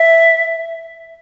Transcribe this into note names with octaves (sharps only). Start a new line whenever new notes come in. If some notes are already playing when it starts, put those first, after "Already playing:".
Already playing: E5